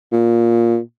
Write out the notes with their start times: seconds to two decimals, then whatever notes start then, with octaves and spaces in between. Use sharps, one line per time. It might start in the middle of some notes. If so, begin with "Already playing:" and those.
0.12 A#2